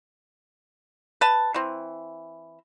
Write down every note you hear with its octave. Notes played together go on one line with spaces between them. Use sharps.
B4 A5
E3 C4